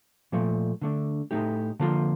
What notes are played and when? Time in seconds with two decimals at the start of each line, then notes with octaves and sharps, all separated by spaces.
0.32 A#2 F3 A3
0.81 D3 A3 D4
1.31 A2 A3 D#4 G4
1.79 D3 F3 A#3 F4